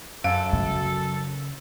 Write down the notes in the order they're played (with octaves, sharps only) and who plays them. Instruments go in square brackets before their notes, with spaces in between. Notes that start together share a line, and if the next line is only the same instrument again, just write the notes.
[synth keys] F#2 [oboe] A4 [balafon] F5
[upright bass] C#3